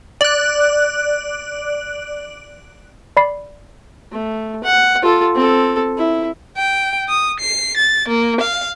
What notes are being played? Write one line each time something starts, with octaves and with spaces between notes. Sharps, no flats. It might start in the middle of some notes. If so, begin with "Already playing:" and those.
D5 F#6
D5 B5 C7
A3
F#5
F4 A4
C4 A4
E4
G5
D#6
C7
A6
A#3
F5